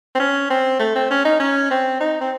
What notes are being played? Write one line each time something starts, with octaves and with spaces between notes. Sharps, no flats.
C4
C#4
C4
A3
C4
C#4
D#4
C#4
C4
D#4
C4